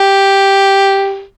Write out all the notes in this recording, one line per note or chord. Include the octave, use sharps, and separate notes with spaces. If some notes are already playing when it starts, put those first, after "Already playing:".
Already playing: G4